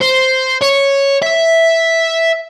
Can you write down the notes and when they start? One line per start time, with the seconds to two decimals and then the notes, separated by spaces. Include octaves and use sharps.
0.01 C5
0.62 C#5
1.23 E5